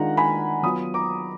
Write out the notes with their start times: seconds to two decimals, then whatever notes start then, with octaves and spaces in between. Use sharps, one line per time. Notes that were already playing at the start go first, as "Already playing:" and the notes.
Already playing: D#3 G#3 D4 F4 F#5 A#5
0.17 G#5 B5
0.63 F#3 B3 F4 B5 D#6
0.94 A#5 D6